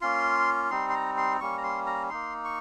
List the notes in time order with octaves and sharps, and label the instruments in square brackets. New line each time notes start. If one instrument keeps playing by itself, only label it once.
[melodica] A#3 C#4 F4 C6
G3 C4 D#4 C6
C6
A#5
C6
G3 A#3 C#4 C#6
A#5
C6
A#5
A#3 D#4 C6
C#6